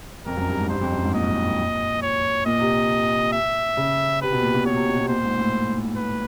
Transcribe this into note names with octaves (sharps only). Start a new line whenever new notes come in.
F2 A#4
F#2
G2
G#2
G2 C5
F2
F#2
G#2
A#2 D#5
C#5
A#2 D#5
C3
E5
C#3
C3 B4
B2
A#2
B2
B2 C#5
C3
B2
B2
A#2 C5
G#2
A2
B4